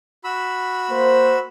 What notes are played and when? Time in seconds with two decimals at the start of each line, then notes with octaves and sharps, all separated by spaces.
0.24 F#4 B5 E6
0.90 A#3 C5